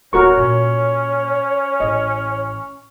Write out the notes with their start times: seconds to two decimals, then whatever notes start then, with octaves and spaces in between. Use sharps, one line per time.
0.13 D1 A3 F#4 A#4 C#5 C#6
0.37 A#2 C#4
1.80 A1 D#5